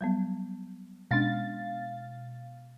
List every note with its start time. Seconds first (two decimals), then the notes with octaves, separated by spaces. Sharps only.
0.01 F#3 G3 B3
1.11 B2 G#3 C#4 D4 F5 A6